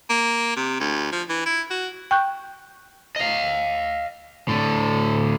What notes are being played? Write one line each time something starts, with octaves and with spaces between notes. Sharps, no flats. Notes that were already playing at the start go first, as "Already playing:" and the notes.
A#3
C3
D2
F3
E3
E4
F#4
G5 C#6 F#6 G6
D#5 F5
A2 D3